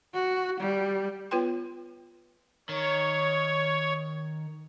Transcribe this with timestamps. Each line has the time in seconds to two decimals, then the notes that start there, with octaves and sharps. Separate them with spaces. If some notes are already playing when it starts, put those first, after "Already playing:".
0.14 F#4
0.60 G3
1.31 B3 F4 B4 C#5 G5 C6
2.69 D#3 C#5